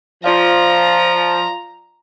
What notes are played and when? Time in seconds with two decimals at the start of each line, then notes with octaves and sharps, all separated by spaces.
0.24 F3 F4 D5 F5 A#5